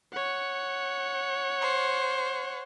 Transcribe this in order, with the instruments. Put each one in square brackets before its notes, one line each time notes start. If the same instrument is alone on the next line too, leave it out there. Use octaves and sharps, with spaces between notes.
[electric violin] C#5 F#5
[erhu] C5